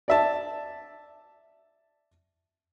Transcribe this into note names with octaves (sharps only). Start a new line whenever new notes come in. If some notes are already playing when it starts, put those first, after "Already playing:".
D5 E5 A5